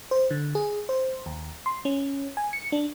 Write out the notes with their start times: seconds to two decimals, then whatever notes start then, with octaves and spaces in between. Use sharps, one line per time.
0.11 C5
0.31 D3
0.55 G#4
0.89 C5
1.26 D#2
1.66 C6
1.85 C#4
2.37 G#5
2.53 C#7
2.72 D4